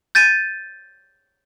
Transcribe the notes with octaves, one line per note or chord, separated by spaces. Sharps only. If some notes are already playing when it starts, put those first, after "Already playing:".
G6 A6 D#7